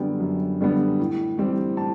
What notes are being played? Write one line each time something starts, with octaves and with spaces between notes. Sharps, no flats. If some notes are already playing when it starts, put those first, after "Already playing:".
Already playing: F#2 D3 G3 B3 G5
F#2
D3 G3 B3
A2
E3 G3 C4
A2 A5